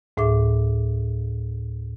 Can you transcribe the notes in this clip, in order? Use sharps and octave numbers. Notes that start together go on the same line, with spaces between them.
D2 A2 G#4 E5 D6